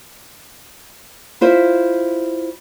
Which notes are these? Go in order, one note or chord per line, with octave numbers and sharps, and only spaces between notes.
E4 F4 C5 E5